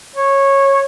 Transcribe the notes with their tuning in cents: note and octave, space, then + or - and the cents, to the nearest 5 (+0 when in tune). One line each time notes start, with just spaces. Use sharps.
C#5 -15